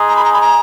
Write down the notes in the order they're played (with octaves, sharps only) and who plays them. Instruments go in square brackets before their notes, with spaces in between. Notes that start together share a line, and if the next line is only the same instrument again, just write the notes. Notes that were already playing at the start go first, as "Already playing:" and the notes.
Already playing: [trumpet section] G#3 D#4 G#4
[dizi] A#5
B5
A#5
B5
A#5